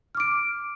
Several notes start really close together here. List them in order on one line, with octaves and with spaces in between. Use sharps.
F6 D6 D7